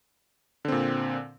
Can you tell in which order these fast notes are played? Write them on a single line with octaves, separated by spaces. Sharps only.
D3 C4 A#2